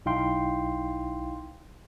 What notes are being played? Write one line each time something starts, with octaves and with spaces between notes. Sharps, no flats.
B1 D#4 E4 F5 G5 C6